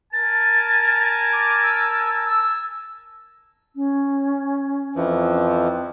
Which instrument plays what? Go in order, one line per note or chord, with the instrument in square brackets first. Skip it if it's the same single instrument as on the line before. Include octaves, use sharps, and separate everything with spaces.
[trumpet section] A#4 G#5 A5 [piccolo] A6
[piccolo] D6
E6
E6
[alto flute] C#4
[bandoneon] F2 E3 F3